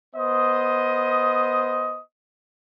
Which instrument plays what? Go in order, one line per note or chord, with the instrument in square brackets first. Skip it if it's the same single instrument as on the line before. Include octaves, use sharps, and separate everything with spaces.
[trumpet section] B3 C5 D#5 D#6